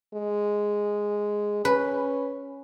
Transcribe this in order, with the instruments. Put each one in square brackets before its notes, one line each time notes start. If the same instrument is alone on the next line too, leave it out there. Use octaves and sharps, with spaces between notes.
[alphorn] G#3
[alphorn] C#4 [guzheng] B4